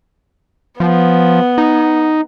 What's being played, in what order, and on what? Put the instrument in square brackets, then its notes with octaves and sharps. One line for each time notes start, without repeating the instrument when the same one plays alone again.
[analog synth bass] F3 [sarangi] B3
[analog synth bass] D#4